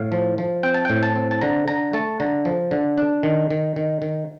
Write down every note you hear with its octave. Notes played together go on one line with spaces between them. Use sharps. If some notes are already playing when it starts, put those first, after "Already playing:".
Already playing: A2 F5
F3
F3
C4 G5
A5
A2 G5
A5
C4
A5
D3 A#5
D3 A#5
A3 A5
D3 A#5
F3
D3
D4
D#3
D#3
D#3
D#3